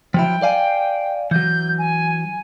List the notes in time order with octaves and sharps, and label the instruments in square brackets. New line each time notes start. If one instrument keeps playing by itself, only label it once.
[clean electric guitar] F3 F#3 E4 [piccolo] G5
[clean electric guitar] D5 F5 G#5
[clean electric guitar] E3 F#3 [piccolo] G6
[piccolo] G#5